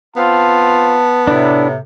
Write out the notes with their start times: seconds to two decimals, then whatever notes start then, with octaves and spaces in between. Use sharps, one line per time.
0.16 B3 C4 F4 F5 A5
1.27 A2 C3 D4 E4